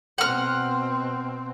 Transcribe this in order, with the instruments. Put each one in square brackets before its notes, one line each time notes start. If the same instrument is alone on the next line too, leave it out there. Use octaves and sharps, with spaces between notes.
[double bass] B2 C4 [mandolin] F#5 F6